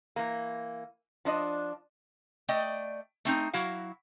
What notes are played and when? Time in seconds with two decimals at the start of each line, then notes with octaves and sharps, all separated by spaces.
0.16 E3 A#3
1.25 F3 D4 D#5
2.48 A3 D5 D#5 G5
3.25 A3 C4 D#4
3.53 F#3 E4 F#4 F5